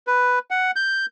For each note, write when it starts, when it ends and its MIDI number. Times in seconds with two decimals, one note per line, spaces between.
0.07 0.39 71
0.51 0.71 78
0.76 1.06 91